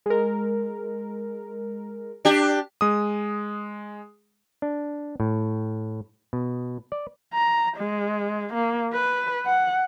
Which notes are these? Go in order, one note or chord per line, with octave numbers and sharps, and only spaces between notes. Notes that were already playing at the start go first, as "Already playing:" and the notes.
G#3 A#4
D4 G4
G#3 D#6
D4
A2
B2
D5
A#5
G#3
A#3
B4
F#5